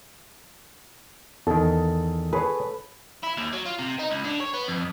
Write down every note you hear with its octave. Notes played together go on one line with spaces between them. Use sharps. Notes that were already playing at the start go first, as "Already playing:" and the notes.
E2 D#3 A4
G#4 B4 C#5
E4
D#2
F#3
F4
C3
D#4
C#2
D3
C#5
B3
F2